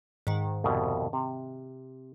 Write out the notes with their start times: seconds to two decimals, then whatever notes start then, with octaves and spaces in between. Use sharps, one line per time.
0.27 G#2 D#3
0.64 C2 F2 B2
1.13 C3